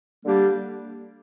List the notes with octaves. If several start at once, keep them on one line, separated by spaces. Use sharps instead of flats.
D3 G3 A#3 D4 G4